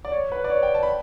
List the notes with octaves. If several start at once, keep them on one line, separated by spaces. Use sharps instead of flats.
D5
C#5
B4
D5
C#5
G5
A5
B5